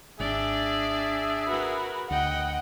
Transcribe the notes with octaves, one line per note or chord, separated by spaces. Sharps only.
G#1 D4 G#4 D5 E5
F#4 A#4 B4
D2 D#5 F#5 G5